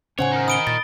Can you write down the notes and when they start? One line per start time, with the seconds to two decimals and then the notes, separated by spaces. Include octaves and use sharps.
0.19 A2 C#3 C#4 C5 C#5 F#5 G#5
0.32 D#4 A#4
0.48 B5 D#6 D7 G7
0.67 A#2 A6